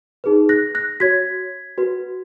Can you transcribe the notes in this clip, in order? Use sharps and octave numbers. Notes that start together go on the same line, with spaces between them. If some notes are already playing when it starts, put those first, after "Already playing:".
D#4 G#4 B4
F#6 A#6
F#6 A#6
F#4 C#5 G#6 B6
F#4 B4